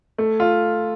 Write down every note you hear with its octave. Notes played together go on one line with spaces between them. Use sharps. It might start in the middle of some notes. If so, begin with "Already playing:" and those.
A3
F4